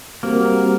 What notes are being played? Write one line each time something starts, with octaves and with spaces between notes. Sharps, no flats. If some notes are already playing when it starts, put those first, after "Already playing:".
G3 A#3 C4 F#4 A#4